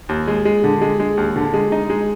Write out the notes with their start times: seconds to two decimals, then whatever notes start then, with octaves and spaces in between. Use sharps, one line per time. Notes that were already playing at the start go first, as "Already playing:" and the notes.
0.09 D#2
0.27 G#3
0.45 G#3
0.64 D3
0.81 G#3
1.00 G#3
1.17 D#2
1.36 D3
1.53 G#3
1.72 D#4
1.90 G#3